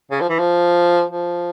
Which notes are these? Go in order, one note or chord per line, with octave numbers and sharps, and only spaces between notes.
C#3
F3
E3
F3
F3